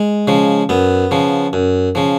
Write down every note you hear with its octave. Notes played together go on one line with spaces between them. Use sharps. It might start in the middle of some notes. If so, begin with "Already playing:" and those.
Already playing: G#3
C#3 F3
F#2 B3
C#3 F3
F#2
C#3 F3